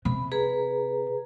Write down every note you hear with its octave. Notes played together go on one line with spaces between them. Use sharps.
C3 B5
G#4 B4 A#5